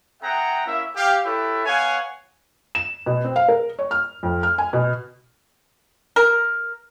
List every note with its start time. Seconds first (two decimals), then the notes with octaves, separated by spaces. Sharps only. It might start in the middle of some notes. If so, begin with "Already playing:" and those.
0.21 C4 G#4 E5 F#5 G5 A#5
0.66 A#3 C#4 E4 E5
0.96 G4 F5
1.24 E4 G4 A4 B4 C#5 E5
1.66 B3 C#5 F5 F#5 G#5
2.75 E7
3.06 B2
3.24 C4
3.36 F5
3.48 A#4
3.79 C#5
3.91 F6
4.23 F2
4.43 F6
4.58 G#5
4.73 B2
6.16 A#4